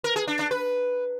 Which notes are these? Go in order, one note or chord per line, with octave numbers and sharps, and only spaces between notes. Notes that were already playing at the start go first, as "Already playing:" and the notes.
A#4
G#4
D4
D4
B4